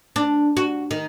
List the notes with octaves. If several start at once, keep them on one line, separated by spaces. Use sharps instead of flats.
D4
F#4
D#3